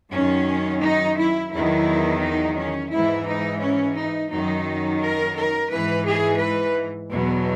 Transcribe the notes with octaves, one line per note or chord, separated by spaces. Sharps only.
F#2 D#3 F#3 C#4
D#4
E4
E2 D#3 F#3 E4
D#4
C#4
G#2 E3 E4
D#4
C#4
D#4
F#2 D#3 F#3 D#4
A#4
A#4
G#2 E3 B4
G#4
B4
E2 B2 F#3